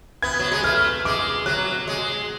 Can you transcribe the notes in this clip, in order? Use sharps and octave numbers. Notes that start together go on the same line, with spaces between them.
B3 G#6
F#3
G#3
A3 F6
G#3 D6
F#3 F#6
G#3